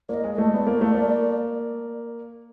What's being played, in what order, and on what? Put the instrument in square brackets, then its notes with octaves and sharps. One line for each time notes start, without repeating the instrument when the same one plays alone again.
[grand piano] A#3 [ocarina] D5 D#5
[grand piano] G#3
[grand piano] A3 [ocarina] D#5
[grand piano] B3 [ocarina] D5
[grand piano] A#3
A3
A#3